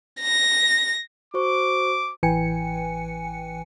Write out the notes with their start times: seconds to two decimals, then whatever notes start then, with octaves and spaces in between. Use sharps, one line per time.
0.21 A#6
1.34 F#4 C5 C#6 D6
2.23 A1 E3 B4 G5 G#5 C#7